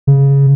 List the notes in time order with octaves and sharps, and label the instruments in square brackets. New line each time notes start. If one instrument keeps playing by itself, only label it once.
[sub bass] C#3